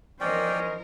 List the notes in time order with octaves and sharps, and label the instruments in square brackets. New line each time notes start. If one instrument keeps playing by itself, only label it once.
[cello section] E3 F3 A#4 [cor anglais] C#4 [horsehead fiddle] C5 D#5 [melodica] D5 G5